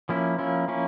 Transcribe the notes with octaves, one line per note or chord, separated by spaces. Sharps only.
F3 A#3 C#4 E4
F3 A#3 C#4 E4
F3 A#3 C#4 E4